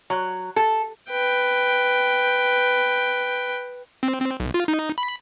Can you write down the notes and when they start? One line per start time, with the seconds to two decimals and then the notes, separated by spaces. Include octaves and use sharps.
0.10 F#3
0.56 A4
1.10 B4 G5
4.03 C4
4.20 C4
4.40 B1
4.54 F4
4.68 D#4
4.98 B5